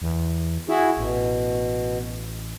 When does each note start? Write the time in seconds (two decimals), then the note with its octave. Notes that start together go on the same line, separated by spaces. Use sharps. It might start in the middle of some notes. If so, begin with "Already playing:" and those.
0.02 E2
0.69 E4 F#4 G#4
0.97 A1 B2